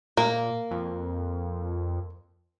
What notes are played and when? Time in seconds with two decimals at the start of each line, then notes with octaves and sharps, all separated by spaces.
0.17 A#2 A#3
0.71 F2